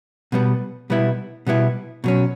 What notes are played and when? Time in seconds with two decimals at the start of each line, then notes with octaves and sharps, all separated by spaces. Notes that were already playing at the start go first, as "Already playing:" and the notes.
0.32 B2 G3 B3
0.90 B2 G3 B3 E4
1.47 B2 G3 B3 E4
2.04 B2 F#3 C#4